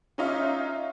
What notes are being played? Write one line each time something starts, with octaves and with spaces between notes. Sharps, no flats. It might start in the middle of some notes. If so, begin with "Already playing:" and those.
C#4 D#4 F4 D#5 E5